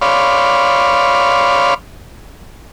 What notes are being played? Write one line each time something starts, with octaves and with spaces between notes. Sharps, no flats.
C#5 D5 F5 B5 C6